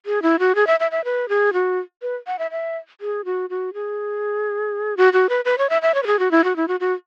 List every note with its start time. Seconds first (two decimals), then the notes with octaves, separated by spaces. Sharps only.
0.06 G#4
0.22 E4
0.39 F#4
0.55 G#4
0.67 E5
0.80 E5
0.91 E5
1.04 B4
1.29 G#4
1.53 F#4
2.02 B4
2.27 F#5
2.39 E5
2.51 E5
3.01 G#4
3.25 F#4
3.50 F#4
3.74 G#4
4.97 F#4
5.13 F#4
5.29 B4
5.45 B4
5.58 C#5
5.69 E5
5.82 E5
5.94 C#5
6.03 B4
6.07 G#4
6.19 F#4
6.31 E4
6.44 F#4
6.56 E4
6.68 F#4
6.80 F#4